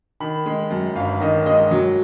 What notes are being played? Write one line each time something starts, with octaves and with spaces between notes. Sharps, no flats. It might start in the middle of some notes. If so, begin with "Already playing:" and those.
D#3 B5
G#3
F#2
G1 F5
D#3 D#5
G#3 D#5
F#3